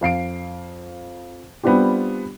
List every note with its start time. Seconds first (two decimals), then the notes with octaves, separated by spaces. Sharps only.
0.01 F2 F5 C7 D7
1.63 G3 B3 C4 D4 F4 G4